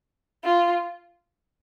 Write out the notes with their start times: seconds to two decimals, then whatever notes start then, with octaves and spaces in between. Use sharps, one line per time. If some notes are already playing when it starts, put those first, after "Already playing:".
0.44 F4